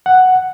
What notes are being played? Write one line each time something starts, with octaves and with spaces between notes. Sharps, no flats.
F#5